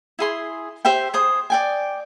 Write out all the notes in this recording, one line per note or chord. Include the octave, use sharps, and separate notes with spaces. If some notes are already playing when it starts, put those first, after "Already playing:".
E4 G#4 C6
G4 C5 E5 G5
G#4 C5 D#6
D5 G5 G#5